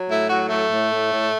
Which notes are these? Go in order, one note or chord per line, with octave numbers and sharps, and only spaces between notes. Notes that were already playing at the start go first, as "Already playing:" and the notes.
Already playing: F#3
A2 E4
F#3 F#4
A2 A3
A2
A2
A2